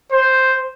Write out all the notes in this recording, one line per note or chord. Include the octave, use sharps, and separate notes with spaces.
C5